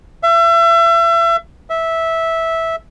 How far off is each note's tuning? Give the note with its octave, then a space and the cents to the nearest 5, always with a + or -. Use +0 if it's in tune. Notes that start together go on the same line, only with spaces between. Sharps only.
E5 +35
E5 -10